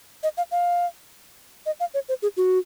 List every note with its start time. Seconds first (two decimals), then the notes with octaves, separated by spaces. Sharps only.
0.23 D#5
0.37 F5
0.51 F5
1.66 D#5
1.80 F5
1.94 C#5
2.09 C5
2.23 G#4
2.37 F#4